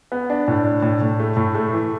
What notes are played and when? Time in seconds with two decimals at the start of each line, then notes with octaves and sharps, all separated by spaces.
0.12 B3
0.30 D4
0.48 A2
0.65 D4
0.82 A2
1.02 A2
1.19 A3
1.37 A2
1.55 A3
1.73 E3